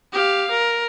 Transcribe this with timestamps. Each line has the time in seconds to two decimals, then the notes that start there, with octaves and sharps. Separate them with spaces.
0.13 G4 F5
0.50 A#4